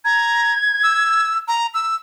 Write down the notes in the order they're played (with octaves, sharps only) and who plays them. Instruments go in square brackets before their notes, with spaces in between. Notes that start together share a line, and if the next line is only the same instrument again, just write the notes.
[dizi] A#5 [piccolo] G#6
[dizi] E6
A#5
E6